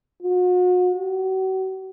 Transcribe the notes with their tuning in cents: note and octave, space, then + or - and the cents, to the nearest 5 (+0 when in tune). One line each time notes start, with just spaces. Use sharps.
F#4 -40
F#4 +40